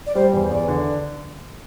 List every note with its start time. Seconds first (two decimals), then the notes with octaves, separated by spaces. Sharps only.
0.06 D5
0.15 G3 C5
0.33 E2
0.51 E2 D5
0.68 D3